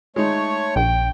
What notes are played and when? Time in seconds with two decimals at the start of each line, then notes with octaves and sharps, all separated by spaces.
0.16 G#3 A3 D#4 C#5
0.76 A#1 G5